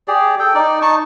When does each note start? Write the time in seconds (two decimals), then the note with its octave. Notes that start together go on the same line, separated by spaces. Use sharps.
0.08 G4 G#4 D5
0.39 A4 G5
0.55 D#4 D5
0.82 D#4 A5 C#6